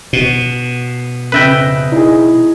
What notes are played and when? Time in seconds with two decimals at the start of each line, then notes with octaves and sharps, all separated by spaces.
0.13 B2
1.32 F2 C#3 B4 E5 G5 A#6
1.92 D#4 E4 G#4